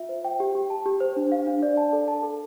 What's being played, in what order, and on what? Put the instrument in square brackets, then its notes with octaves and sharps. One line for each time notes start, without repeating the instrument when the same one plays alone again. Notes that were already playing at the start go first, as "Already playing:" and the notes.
Already playing: [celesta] F4 E5
C5
G5
G4
G4
A5
G4
C5
D4
F5
D4
D5
A5
A4
A5
A4